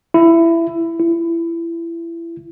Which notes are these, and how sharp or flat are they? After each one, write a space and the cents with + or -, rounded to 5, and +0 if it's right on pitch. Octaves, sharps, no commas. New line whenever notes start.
E4 +15
E4 +25